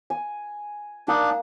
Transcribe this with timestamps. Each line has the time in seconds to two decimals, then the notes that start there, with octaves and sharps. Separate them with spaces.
0.10 G#5
1.08 A#3 D4 D#4 F#5